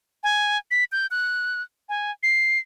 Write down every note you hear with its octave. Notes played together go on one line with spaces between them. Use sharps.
G#5
B6
G6
F#6
G#5
C7